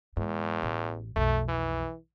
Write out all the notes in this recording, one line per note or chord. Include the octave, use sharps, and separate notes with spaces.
E2 G#2
A1
B1 F2 A3
E3